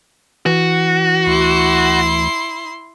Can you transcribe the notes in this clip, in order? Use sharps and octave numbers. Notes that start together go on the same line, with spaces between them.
E3 F#4
D2 E4 C6